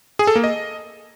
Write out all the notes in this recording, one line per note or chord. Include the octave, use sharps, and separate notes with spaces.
G#4
A4
A#3
D#5